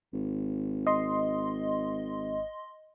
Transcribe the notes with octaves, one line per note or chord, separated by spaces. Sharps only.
G#1
D#5 C6